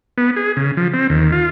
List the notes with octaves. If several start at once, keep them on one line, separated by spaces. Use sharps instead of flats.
B3
G#4
C#3
F3
C4
D#2
F4